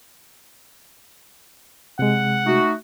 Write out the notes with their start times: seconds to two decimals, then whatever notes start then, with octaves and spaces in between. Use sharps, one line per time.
1.99 C3 G#3 F#5
2.45 A3 D#4 F#4